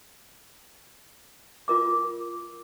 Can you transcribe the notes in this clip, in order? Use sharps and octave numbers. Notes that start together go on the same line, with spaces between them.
F4 A#4 D6